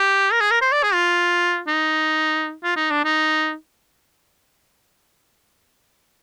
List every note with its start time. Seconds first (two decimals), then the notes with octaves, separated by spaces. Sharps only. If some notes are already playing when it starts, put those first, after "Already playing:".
Already playing: G4
0.32 A#4
0.41 G#4
0.51 A#4
0.62 C5
0.72 D5
0.83 G#4
0.94 F4
1.68 D#4
2.64 F4
2.76 D#4
2.91 D4
3.05 D#4